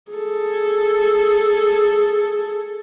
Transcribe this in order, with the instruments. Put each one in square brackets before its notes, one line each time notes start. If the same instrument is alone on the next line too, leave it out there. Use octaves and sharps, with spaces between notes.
[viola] G#4 A4